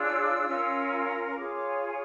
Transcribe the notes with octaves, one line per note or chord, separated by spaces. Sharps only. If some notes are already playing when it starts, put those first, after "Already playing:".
Already playing: D4 F4 G#4 C#5 E6
C#4 F4 A#4
F4 G#4 C#5 D6
D6
G#5
G#5